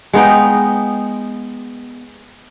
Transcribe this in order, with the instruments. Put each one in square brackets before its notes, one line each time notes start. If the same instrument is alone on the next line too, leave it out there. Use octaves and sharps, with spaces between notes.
[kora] G#3 B3 D#4 G5